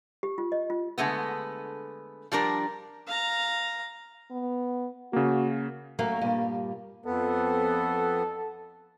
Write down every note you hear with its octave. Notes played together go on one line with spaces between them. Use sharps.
G4
F4
D#5
F4
D3 G#3 A3 B3
F3 G3 D4 A#4
F5 A#5
B3
C#3 A#3 F#4
F#3 A3 A#3 C#4
G2 A#2 G3
F2 B3 A4